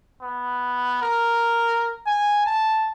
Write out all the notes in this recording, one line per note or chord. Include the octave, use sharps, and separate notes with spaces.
B3
A#4
G#5
A5